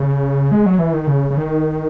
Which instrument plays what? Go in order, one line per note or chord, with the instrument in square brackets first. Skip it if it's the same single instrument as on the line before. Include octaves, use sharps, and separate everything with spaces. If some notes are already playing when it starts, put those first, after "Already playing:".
Already playing: [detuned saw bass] C#3
G#3
F#3
E3
D#3
C#3
C#3
D#3